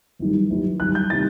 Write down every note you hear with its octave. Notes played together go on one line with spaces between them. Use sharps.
G1 F#2 D#3 G3
G1 F#2 D#3 G3
G1 F#2 D#3 G3 F#6
G6
C3 D#3 G3 A6